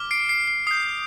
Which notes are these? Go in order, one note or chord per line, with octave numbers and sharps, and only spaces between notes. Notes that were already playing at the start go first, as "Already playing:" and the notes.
Already playing: D6 F6
C7 D7
C7
C7
D#6 G6 C7